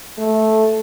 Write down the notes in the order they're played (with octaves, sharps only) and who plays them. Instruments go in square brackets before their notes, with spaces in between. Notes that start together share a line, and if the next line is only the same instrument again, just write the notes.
[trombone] A3